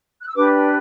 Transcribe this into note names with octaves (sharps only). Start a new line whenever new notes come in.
F#6
E6
D4 G4 B4 D6